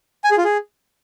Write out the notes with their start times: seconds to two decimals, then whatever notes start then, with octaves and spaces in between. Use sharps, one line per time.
0.24 G#5
0.31 G#4
0.38 F4
0.45 G#4